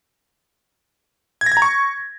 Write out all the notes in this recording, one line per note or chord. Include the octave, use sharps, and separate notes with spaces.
G#6
A#6
G#6
A#5
C#6